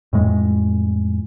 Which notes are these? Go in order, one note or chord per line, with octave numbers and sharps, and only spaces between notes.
F2 A2 G#3